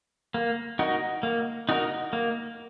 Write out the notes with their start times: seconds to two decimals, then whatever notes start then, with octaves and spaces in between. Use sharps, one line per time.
0.34 A#3
0.79 D#4 F#4 A#4
1.23 A#3
1.69 D#4 F#4 A#4
2.13 A#3